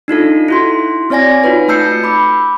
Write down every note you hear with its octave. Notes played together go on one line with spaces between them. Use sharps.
D4 D#4 F4 A4
E4 F#4 C6
C4 C#5 D5 G#5 A#6
D#4 F4 F#4 B4
A3 A5 E6 G6 C7 C#7
B5 D6